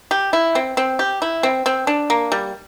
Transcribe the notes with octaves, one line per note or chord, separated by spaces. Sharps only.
G4
E4
C4
C4
G4
E4
C4
C4
D4
A#3
G3